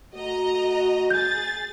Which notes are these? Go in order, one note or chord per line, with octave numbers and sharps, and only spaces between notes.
A3 F#4 D#5 A#5
G#4 G6 A6